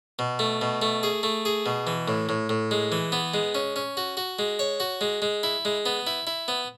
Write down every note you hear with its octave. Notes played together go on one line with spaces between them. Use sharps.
B2
A3
B2
A3
G#4
A3
G#4
B2
E3
A2
A2
A2
G#3
E3
B3
G#3
C#4
C#4
F#4
F#4
G#3
C#5
F#4
G#3
G#3
E4
G#3
B3
E4
E4
B3